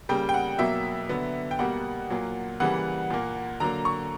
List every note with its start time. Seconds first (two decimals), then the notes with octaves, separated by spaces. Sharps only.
0.09 C#3 G3 A#3 G5
0.29 G5
0.34 F#5
0.59 B2 F#3 A#3 E5
1.09 D3 F#3 B3
1.51 G5
1.59 B2 G3 A#3 F#5
2.10 A#2 F#3 A#3
2.60 C#3 E3 G3 A#3 F#5
3.10 A#2 A#3
3.60 D3 F#3 A#3 A#5
3.85 C#6